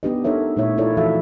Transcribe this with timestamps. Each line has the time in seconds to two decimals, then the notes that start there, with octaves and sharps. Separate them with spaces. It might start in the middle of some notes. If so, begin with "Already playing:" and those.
0.03 B3 D4 D#4 G4 B4 D#5
0.24 D#4 A4 A#4 C#5 E5
0.56 A#2 A3 D#4 E4 C#5 E5
0.78 E4 F4 A4 A#4 C#5 D5
0.97 E3 F3 F#4 A4 E5 F5